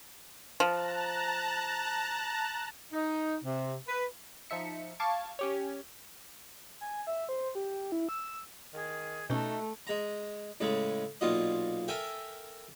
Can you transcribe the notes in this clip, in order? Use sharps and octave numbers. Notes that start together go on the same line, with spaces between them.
F3 A5 A#5 F#6
D#4
C3
B4
F3 D#4 E5 C#7
F5 A5 C#6 D6 G#6 D7
C#4 G4 C#5
G#5
E5
C5
G4
E4
E6
D#3 G#4
B2 A3 C#4 D#4 F#4 A4 E5
G#3 A#5
A2 C#3 G#3
B1 A#2 F4 D#5
A4 A#4 E5 G5 G#5